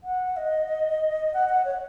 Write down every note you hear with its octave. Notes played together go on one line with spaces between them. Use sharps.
F#5
D#5
F#5
F#5
C#5